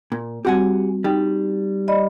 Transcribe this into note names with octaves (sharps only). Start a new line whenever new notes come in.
A#2
G3 C4 F#4 G4 F#5 G#5
G3 D#4 G5
D5 D#5 B5